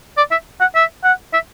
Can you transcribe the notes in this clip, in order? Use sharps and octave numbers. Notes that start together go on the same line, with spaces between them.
D5
E5
F#5
E5
F#5
E5